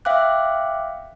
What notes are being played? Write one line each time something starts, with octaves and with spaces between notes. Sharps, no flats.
E5 F5 G5 D6 F#6